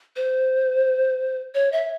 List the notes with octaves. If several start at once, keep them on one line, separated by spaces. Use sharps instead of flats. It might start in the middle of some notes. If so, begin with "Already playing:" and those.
C5
C#5
E5